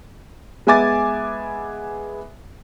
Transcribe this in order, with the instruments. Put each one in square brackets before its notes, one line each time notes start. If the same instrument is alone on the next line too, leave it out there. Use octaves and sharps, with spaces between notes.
[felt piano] G#3 B3 E5 G#5 D6 A6